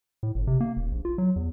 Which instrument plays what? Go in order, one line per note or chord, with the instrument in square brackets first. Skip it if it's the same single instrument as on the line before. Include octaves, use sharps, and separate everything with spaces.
[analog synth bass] A2
G1
C3
A#3
D#1
A#1
F4
F#3
E2